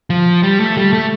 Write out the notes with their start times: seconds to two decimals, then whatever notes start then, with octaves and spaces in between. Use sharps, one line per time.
0.10 F3
0.43 G3
0.60 A3
0.77 G3
0.93 A3